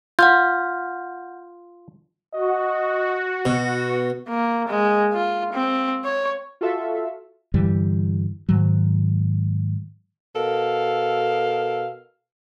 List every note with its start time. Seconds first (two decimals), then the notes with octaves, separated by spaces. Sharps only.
0.19 F4 F#5 F6 G6
2.33 F#4 D#5
3.45 B2 B3
4.28 A#3
4.68 G#3
5.13 F4
5.53 C4
6.04 C#5
6.61 F4 F#4 A4 E5 F5
7.54 G2 D3 E3 G3
8.49 G#2 D#3 F#3
10.36 B2 A4 A#4 F5